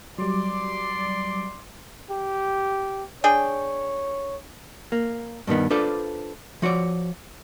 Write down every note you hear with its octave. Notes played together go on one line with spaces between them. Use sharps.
F#3 G3 D5 C6 D6
G4
D4 G#4 C#5 G5
A#3
G2 B2 D#3 B3
D4 F4 A4 B4 C5 D5
F3 F#4 C#5 D5